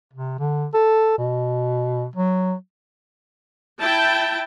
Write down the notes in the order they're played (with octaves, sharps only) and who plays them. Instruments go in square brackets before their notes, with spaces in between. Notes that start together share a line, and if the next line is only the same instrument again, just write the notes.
[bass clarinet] C3
D3
A4
B2
F#3
[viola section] E4 G5 A5